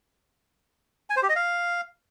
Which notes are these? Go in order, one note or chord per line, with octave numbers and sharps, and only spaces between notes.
G#5
C5
G4
D#5
F5